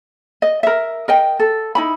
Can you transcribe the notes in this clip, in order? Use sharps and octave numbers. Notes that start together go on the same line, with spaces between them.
D#5
A#4 E5
A#4 D#5 G5
A4
D#4 E4 B5